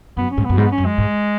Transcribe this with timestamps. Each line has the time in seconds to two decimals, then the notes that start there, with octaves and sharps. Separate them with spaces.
0.17 F#2 B3
0.31 C#4
0.38 G#2
0.45 B3
0.49 F#2
0.58 G#2 B3
0.72 C#4
0.78 F#2
0.85 G#3
0.98 G#2